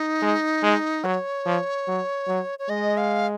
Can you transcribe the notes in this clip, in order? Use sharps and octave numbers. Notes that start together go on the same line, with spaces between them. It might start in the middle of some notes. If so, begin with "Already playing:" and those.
Already playing: D#4
G#3
G#3
F#3 C#5
F3
F#3
F#3
C#5
G#3 D#5
F5